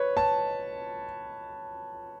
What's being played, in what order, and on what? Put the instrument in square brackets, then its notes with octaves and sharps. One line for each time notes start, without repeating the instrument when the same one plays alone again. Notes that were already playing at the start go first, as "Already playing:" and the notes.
Already playing: [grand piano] B4 C#5
A5